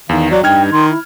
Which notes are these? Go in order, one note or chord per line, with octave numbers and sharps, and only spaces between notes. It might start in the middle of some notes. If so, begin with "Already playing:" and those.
E2 D#3 F5
F#3 D5
G2 D#4 G5 F6 G#6
D#3 C6
E4